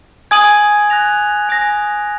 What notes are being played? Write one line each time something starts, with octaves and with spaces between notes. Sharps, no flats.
G#5 D#6 G#6 D#7 F#7
F#6 A#6 F7
G#5 D#6 A#6